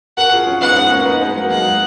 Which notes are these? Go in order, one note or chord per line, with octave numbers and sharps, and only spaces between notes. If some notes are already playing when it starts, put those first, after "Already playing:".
F#4 A#4 F#5
F4 G#4
C#4 F4
B3 D#4 F#5
G#3 B3
A#3 C#4
B3 D#4
G#3 B3
F#3 A#3
G#3 F#5
F#3